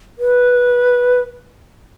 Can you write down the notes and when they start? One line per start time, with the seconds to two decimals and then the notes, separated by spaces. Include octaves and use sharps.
0.18 B4